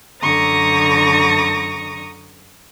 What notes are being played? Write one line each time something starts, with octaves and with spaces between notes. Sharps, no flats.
F#2 D3 A#5 C#6 D#6 A#6